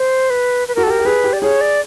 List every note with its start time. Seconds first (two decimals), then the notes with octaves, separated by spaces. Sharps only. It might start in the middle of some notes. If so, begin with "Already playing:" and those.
Already playing: C5
0.30 B4
0.68 B4
0.75 F#4 A#4
0.83 A4
0.87 G4
0.90 A#4
0.99 G4
1.05 G#4 B4
1.24 G4
1.33 D5
1.42 G#4 C#5
1.61 D5